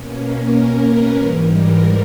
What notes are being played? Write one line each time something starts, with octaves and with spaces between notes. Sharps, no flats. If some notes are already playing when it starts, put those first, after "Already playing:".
Already playing: B2 A#3 C#4
A#4
A#4
B4
G#2 E3 G3 A#4
A#4